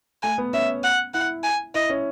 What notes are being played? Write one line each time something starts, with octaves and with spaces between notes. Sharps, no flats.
A3 G#5
B3
C#4 E5
F#5
E4 F#5
G#5
E4 D#5
C#4